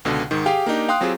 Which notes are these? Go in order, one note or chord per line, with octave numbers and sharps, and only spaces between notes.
C#2 B2 D3
G#2 D#3
G4 G#4 F5 G5
A#3 D4 D#4 G4
F5 G5 C6 D#6 F#6
F#3 C4 F4 G4 G#4